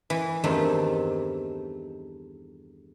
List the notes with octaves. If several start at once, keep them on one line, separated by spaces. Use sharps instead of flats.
E3
E2 G2 D#3 A3 C4